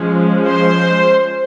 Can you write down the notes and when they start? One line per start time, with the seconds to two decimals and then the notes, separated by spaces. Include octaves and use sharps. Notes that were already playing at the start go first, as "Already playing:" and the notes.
Already playing: F3 G#3 C#4
0.46 C5